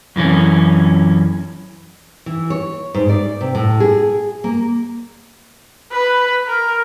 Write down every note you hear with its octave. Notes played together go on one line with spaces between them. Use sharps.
F#2 E3 C#4
E3
C#5
G#2
D5
C3
A2
G#4
A#3
B4
A#4